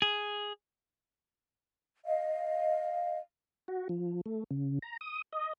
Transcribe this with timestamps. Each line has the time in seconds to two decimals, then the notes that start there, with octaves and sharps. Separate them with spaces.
0.02 G#4
2.06 D#5 F5
3.68 F#4
3.89 F3
4.26 A3
4.51 C#3
4.82 A#5
5.01 D#6
5.33 D#5